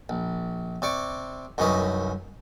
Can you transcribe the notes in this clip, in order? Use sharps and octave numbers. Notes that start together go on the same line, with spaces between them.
A#1
C3 D5 C#6 D6
C2 F#2 D#3 C#4 B4 D#5